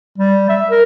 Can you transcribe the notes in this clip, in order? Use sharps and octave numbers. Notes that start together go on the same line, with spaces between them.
G3
E5
A#4